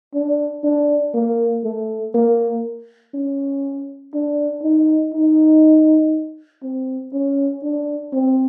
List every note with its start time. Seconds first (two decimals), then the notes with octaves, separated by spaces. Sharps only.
0.14 D4
0.64 D4
1.14 A#3
1.64 A3
2.15 A#3
3.14 C#4
4.14 D4
4.63 D#4
5.14 D#4
6.63 C4
7.13 C#4
7.63 D4
8.13 C4